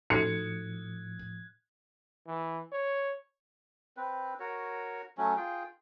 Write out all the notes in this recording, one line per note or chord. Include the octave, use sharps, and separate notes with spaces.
A2 F3 D#4 F#4 A4 F#6 G#6 C#7
E3
C#5
C4 B4
F#4 A#4 C#5
F#3 A3 C#4
F4 G#4 G5